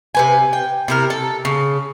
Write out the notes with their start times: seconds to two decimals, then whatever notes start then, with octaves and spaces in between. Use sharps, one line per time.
0.15 C3 B4 G#5
0.53 G5
0.88 C3 E4 A#4
1.10 A4
1.45 C#3